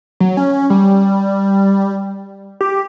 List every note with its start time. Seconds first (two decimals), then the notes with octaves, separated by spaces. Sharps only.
0.20 F#3
0.37 C#4
0.70 G3
2.61 G4